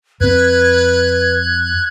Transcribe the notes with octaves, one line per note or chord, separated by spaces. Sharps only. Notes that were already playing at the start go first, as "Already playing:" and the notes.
F2 C4 B4 F#6 G#6